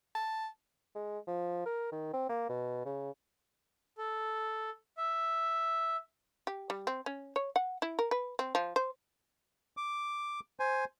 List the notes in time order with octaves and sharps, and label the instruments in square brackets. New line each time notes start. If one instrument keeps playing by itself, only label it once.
[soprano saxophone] A5
[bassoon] G#3
F3
A#4
D#3
C4
A#3
B2
C#3
[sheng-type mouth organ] A4
E5
[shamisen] G4
G3
C4
C#4
C#5
F#5
E4
A#4
B4
C4
F3
C5
[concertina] D6
C5 G#5